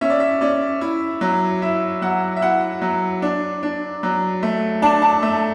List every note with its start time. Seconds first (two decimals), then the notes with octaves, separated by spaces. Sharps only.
0.01 C#4 E5
0.10 D5
0.20 E5
0.41 C#4 D5
0.81 E4
1.21 F#3
1.62 E4 E5
2.02 F#3 F#5
2.36 E5
2.41 E4 F#5
2.82 F#3
3.22 D4
3.63 D4
4.03 F#3
4.43 A3
4.82 D4 A5
5.02 A5
5.23 A3